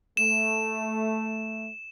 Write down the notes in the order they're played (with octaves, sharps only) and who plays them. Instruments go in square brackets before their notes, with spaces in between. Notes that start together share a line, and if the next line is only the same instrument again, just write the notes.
[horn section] A3 [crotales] E7